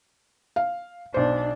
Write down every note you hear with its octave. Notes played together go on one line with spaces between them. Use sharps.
F5
B1 D4 C5